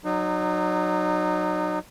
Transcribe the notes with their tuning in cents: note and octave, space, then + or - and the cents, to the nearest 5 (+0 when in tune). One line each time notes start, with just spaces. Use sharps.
F#3 +0 D#4 -30